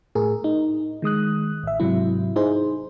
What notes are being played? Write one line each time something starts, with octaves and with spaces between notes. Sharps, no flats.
A2 G#4 A#4
D#4
D#3 G#3 D#6 F#6
A1 E5
G#2 C3 F#3 E4
D#4 E4 G#4 C5